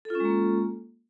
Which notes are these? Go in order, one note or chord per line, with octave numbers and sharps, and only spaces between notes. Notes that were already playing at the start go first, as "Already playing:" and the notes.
G#3 A#3 C#4 F4 A4